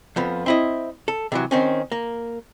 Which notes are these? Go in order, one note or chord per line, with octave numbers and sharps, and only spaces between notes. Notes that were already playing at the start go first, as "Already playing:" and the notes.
F2 F3 B3
C4 E4 D#5
A4
C3 E3 F#3
D#3 C4 C#4
A#3